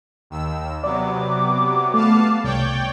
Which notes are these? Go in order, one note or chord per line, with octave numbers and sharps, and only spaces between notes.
D#2 D#3 E6
C3 F#3 B3 D5 D6
A3 B3 F5 A5
C2 C#5 D5 G5